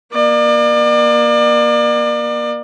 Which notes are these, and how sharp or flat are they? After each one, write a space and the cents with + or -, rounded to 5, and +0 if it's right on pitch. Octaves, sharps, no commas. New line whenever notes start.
A#3 +25 D5 +35